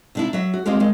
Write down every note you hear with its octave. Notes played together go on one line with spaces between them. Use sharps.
C3 D4 E4
F#3 E5
F#4
G#3 A#3 C4 F4 G4
D#3 G#3